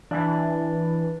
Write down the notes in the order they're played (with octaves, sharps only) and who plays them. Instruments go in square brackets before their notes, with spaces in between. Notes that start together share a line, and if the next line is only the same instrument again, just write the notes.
[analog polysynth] E3 [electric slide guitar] D4